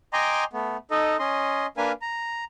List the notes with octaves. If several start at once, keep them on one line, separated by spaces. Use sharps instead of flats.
D#5 G5 G#5 A#5 C6 D6
A3 B3
D#4 A4 D#5
C#4 D#5 C6
A#3 D4 A#4 B4 F5 G#5
A#5